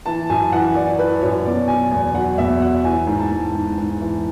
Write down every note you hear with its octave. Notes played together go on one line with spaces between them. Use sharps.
E3 A5
F#2 G#5
E3 F#5
E3 D5
E3 B4
F#2 C#5
B2 D5
F#3 G#5
E2 G#5
F#3 F#5
E2 E5
F#3 F#5
E3 G#5
G#2
A5
G#2
G#2
G#2
E3